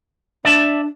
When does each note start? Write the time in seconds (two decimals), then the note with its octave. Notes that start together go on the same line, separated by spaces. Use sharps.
0.45 D4 D5 E5 A5